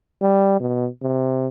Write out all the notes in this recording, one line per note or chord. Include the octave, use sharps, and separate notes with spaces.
G3
B2
C3